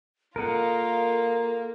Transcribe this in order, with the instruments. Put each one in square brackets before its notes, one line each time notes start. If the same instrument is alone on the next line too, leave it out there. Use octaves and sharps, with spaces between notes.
[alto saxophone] A#3 [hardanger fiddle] F4 [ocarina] A4 [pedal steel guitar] A#4 D#5 F#5